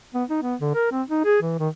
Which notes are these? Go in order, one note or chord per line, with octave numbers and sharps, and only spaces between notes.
B3
D#4
B3
D3
A#4
C4
D#4
G#4
E3
D#3